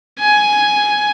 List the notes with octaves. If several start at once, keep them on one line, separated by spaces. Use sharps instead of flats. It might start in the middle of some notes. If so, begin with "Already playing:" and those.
G#5